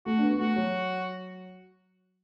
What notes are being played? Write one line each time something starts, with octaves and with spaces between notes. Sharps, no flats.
A3 F#4
D4
B3
A3 F#4
F#3